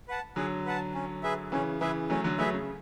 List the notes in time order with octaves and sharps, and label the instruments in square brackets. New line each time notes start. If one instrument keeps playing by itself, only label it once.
[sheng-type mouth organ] B4 F#5 A5
[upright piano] D3 F#3 [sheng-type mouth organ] G#4
[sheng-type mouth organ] B4 F#5 A5
C#4
G#4 B4 E5
[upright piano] C#3 E3 [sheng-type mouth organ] C#4
[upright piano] C#3 E3 [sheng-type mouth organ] G#4 B4 E5
[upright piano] F#3 A3 [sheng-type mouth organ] C#4
[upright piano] D3 F#3
[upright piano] F#3 A3 [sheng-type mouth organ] G#4 B4 E5
[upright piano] C#3